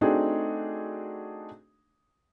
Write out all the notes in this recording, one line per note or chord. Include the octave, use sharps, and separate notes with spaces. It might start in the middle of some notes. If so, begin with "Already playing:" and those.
A3 C4 D4 D#4 F#4 G#4